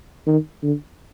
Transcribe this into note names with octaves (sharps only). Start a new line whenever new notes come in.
D#3
D3